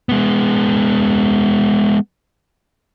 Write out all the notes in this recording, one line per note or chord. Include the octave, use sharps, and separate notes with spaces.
G#3 B3